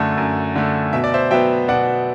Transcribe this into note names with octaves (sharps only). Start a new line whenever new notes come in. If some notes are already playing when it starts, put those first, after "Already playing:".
Already playing: F#2 D3 A3
F#2
D3 A3
B2 E5
D5
C5 E5
F#3 B3 E5 G5
B2 D5 F#5